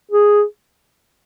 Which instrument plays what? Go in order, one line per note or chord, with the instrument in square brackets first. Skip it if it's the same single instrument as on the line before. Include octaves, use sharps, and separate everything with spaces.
[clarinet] G#4